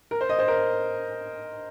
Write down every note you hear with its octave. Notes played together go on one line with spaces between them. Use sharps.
A#4
C5
D#5
C5
A#4